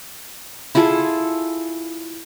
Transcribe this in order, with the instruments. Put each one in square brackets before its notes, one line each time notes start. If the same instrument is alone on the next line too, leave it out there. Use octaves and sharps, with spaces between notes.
[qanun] E4 F4 G#4 A4